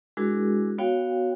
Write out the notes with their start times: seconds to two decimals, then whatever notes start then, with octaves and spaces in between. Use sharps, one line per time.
0.17 G#3 D4 E4 F#4 G#4 A#4
0.78 B3 F#4 C#5 F5 G5